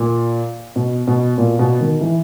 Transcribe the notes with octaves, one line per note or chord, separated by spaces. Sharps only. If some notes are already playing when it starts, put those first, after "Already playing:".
Already playing: A#2
B2
B2
A#2
B2
D#3
E3